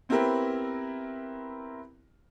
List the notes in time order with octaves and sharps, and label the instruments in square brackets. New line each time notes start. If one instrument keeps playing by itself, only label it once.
[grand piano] B3 C4 E4 G4 A#4 B4